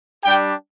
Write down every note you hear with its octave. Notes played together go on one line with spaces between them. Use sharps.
G3 D4 G4 G5